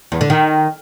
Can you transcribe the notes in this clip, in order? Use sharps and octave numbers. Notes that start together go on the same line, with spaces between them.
E2
D3
D#3